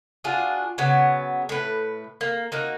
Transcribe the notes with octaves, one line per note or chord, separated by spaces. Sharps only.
D4 F4 F#4 G#4
C#3 F#3 B3
A2 B4
A#3
A#3 D#4 F#4